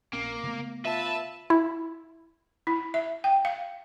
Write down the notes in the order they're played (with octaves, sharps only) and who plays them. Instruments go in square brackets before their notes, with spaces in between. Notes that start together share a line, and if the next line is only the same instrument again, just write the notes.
[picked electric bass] A#1 C4 C#4 [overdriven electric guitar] A#3
[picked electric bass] C#3 A3 B3
[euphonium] F4 [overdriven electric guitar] B4 [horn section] E5 A5
[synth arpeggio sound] E4
[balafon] E4
E5
G5
F5